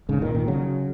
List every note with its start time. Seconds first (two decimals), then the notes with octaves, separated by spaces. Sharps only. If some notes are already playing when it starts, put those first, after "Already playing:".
0.09 G#2 C#3
0.22 A#2 D#3
0.35 A#2 D#3
0.47 C#3 F#3